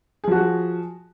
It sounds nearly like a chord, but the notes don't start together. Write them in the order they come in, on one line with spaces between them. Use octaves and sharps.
G#4 F3 F#4